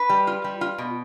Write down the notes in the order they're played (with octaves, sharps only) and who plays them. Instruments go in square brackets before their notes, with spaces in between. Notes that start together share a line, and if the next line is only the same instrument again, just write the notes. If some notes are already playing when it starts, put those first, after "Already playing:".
Already playing: [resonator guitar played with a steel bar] B4
G3
F4
G3
F4
B2